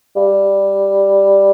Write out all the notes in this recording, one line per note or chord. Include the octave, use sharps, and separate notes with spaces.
G3